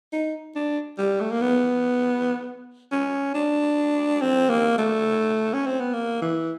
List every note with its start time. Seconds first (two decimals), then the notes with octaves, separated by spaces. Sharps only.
0.12 D#4
0.56 D4
0.98 G3
1.20 A3
1.31 A#3
1.41 B3
2.92 C#4
3.34 D4
4.21 C4
4.49 A#3
4.78 A3
5.54 C#4
5.66 C4
5.80 B3
5.93 A#3
6.22 E3